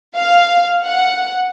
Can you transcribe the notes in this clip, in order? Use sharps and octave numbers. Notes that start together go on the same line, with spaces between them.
F5
F#5